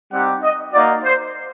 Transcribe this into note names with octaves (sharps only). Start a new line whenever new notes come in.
G3 C4 D#4 G4 F#5
D#5
A#3 D#4 F#4 D5
C5